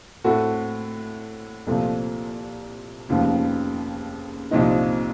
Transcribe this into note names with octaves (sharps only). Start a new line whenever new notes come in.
A2 A3 C4 F#4 A4
C2 A#2 F3 A3 C4
F1 D#2 C#3 F3
C2 A#2 F3 C4 D#4